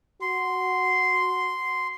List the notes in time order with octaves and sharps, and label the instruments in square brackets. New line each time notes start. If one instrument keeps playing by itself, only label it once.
[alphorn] F#4 [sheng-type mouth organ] C6